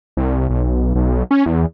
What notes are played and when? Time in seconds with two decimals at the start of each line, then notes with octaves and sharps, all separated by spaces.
0.17 C2
0.50 B1
0.95 B1
1.31 C#4
1.46 E2